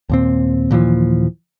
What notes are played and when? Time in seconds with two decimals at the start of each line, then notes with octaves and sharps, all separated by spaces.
0.10 D#2 A#2 C4
0.71 D#2 A#2 E3 F3